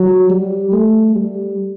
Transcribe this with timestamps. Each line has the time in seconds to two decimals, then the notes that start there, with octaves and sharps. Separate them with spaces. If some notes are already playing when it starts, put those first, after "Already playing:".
Already playing: F#3
0.30 G3
0.72 A3
1.15 G3